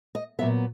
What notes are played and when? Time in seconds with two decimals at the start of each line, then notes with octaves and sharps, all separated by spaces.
0.15 D#5
0.39 A#2 F#3 B3 E5